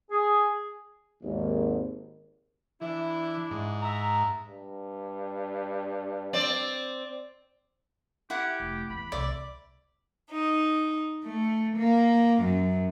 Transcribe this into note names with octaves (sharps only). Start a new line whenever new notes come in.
G#4
G#1 D#2
E3 D4 E4
G#2
E5 A#5
G2
C4 D5
E4 G4 F#5
F1
E2 E3 B5
C2 C3 D5 E5
D#4
A3
A#3
F#2